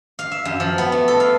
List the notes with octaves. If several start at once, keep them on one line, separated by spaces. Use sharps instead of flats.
F5
E5
F#2
F3
B3
A3
A4
F5